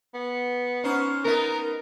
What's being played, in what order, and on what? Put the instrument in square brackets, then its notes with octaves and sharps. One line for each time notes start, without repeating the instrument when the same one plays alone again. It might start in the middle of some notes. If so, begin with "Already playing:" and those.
[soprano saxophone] B3
[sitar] C#4 D#4 C5
[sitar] B3 D#4 [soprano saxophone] A#4